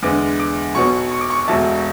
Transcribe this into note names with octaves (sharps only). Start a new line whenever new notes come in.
E2 D3 G#3 B3 D6
D6
B1 B2 F#3 B3 C#6
C#6
D6
C#6
E1 E2 B2 A3 A5